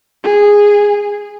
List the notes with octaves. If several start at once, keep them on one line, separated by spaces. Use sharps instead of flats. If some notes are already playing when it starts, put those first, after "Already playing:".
G#4